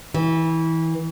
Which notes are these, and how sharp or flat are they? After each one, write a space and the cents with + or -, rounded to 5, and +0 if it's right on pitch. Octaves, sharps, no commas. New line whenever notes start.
E3 -25